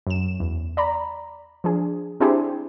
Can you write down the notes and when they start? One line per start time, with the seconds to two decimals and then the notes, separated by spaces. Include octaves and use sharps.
0.07 F#2 E7
0.40 E2
0.77 D5 A#5 B5
1.64 F3 D4 G#4
2.20 C4 D4 E4 G4 G#4 C5